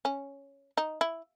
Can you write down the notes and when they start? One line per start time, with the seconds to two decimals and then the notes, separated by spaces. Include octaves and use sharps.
0.05 C#4
0.78 D#4
1.01 E4